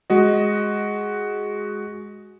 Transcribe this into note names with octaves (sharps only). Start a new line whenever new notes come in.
G#3 F#4 D#5